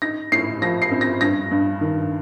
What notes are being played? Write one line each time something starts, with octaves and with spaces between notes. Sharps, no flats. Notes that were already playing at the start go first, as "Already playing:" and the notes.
D#4 A#6
A2 C7
F3 A#6
C7
C4
A#6
G2 A#6
G2
D#3